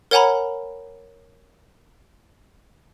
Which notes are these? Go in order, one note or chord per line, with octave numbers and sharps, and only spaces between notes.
A#4 C#5 F#5 G#5 A#5 B5